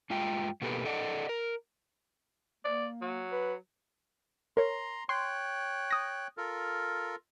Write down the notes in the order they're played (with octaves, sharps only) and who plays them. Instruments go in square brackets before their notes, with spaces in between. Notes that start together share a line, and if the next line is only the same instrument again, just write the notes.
[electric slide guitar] G2 G#3 F4 G5
B2 A#3 B3 G4 A4 B4
A4 D5 D#5 F#5
A#4
[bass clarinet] A#3 [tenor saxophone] D5
[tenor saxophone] F#3
[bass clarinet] B4
[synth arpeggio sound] A#4 C#5 [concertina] A#5 C6
[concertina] C#5 G5 F#6 [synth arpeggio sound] C6
[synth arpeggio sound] D#6 A#6
[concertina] F4 A4 A#4